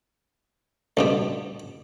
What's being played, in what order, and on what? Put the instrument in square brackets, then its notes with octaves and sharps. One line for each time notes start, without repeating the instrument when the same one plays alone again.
[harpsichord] C#2 G2 B2